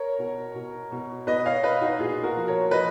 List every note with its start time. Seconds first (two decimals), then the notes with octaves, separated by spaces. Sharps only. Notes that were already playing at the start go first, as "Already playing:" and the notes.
Already playing: A#4 C#5
0.19 B2
0.55 B2
0.91 B2
1.27 B2 B4 D#5
1.45 C#5 F5
1.63 B2 B4 D#5
1.81 D#4 F#4
1.99 A#2 F4 G#4
2.23 F#4 A#4
2.36 F3
2.48 A#4 C#5
2.71 F3 B4 D#5